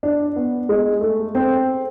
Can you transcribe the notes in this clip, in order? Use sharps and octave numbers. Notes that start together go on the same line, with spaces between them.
D4
B3
G#3
A3
C4